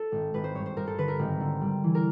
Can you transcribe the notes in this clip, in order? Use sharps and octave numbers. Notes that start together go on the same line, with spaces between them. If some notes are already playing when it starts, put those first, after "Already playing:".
Already playing: A4
G#1
G#1 B4
C5
G2 C#5
C5
G2 A#4
A4
D3 B4
A#4
G#1
D3
G3
E3
A#4